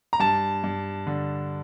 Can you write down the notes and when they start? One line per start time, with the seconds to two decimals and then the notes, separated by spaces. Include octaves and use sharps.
0.13 A#5
0.20 G2 A5
0.64 G2
1.07 D3